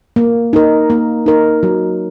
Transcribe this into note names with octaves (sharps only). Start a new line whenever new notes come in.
A#3
D#4 A#4
A#3
D#4 A#4
F#3